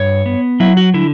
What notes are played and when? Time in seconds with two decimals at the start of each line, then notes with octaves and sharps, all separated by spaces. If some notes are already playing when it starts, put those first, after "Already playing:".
Already playing: G2 C#5
0.26 B3
0.60 F#3 E4
0.77 F#4
0.94 D3 E4